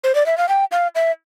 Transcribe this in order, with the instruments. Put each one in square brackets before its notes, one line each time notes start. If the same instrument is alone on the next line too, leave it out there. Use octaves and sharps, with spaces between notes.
[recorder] C5
D5
E5
F5
G5
F5
E5